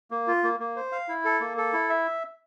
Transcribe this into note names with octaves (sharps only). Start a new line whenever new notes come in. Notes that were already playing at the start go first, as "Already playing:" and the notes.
A#3
F4
A#3
A#3
C5
F5
E4
A4
A#3
A4
E4
E5